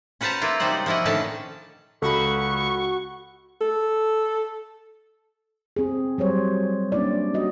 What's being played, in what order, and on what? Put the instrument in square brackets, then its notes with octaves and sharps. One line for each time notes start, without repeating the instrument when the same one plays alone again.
[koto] C#4 F#4 B4 C5 A5 A#5
A#3 E4 F4
C3 F#3 G3 D#4 C5 F#5
F3 A#3 E4 F#4 D#5
A2 D3 D#3 C#4 B4 A5
[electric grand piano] C#2 [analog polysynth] F#4 F#5 [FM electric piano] A4 B5 [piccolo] C#6
[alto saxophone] A4
[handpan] C4 G#4
F#3 G3 C5 C#5
A#3 C#4 D4 E4 D5
F#4 D#5